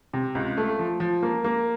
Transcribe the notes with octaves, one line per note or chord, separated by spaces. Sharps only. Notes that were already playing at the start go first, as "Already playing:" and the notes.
C3
C#2
A3
F3
F3
A#3
A#3